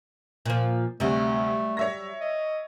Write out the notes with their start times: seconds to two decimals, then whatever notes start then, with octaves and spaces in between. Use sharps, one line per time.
0.46 A#2 F3
1.00 D2 C3 F#3 G3 A3
1.77 C#5 E5 A#6
2.21 D#5